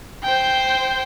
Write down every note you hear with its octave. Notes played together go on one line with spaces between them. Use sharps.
C5 G5